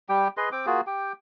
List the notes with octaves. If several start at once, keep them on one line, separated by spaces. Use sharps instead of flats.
G3 G4 G5
G#4 B4 D#5 C6
C4 G5 D6
A#3 F4 F#4 G#4
G4 G5